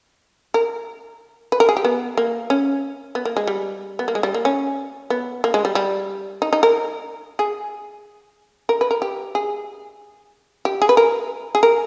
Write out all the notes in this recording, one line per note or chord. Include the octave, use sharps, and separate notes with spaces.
A#4
B4
A#4
G#4
G4
B3
A#3
C#4
B3
A#3
G#3
G3
B3
A#3
G#3
G3
A#3
C#4
B3
A#3
G#3
G3
G3
D#4
D#4
A#4
G#4
A#4
B4
A#4
G4
G#4
G4
G#4
B4
A#4
G#4
A#4